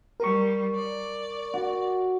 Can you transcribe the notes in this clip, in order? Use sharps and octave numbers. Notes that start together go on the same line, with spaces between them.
G3 A#4 C#6
D5
F#4